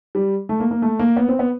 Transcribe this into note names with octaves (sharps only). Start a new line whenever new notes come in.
G3
A3
A#3
A#3
A3
A#3
B3
C4
B3